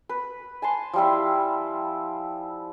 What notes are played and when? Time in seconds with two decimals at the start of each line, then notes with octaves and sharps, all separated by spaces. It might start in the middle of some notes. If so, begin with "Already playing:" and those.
0.09 B4
0.62 G#5 A5 C6
0.93 F3 G3 E4